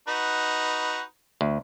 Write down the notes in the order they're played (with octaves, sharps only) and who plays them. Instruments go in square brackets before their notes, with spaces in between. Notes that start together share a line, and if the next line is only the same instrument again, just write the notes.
[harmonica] D#4 F#4 B4
[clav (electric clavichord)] D2